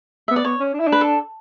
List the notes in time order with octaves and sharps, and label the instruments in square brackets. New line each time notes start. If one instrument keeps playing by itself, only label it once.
[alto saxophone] B3 [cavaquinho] E5
[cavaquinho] D5
[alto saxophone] B3 [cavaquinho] C#5
[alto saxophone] C#4
D4
E4
D4
[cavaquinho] B4
A4